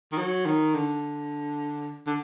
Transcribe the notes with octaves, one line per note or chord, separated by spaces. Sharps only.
D#3
F#3
D#3
D3
D3